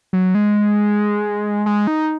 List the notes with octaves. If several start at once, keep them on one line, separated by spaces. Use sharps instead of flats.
F#3
G#3
G#3
D#4